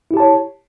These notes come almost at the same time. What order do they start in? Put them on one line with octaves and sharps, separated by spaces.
E4 G4 A5 C#5